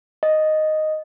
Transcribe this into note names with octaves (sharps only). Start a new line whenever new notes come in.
D#5